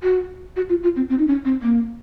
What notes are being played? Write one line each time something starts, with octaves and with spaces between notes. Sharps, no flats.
F#4
F#4
F4
F4
C4
C4
D#4
C#4
C4
A#3